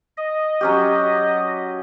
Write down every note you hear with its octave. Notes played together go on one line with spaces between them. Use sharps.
D#5
F#3 C#4 G4